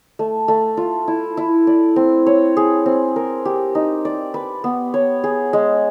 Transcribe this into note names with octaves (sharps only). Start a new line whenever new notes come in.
A3
A3
F4
E4
E4
D5
C4
C#5
G#4
C4
A#4
G4
D#4
D5
B4
B3
C#5
G#4
G#3